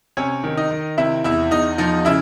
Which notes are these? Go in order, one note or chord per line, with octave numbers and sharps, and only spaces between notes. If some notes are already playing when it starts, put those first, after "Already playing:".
C3 C#4 C#5
D#3
D#4 D#5
D#3
C3 E4 E5
E2 E4 E5
E2 D#4 D#5
F3 D#4 D#5
C#3 E4 E5